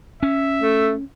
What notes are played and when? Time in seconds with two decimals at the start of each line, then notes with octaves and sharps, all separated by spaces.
0.23 C#4 E5
0.62 A3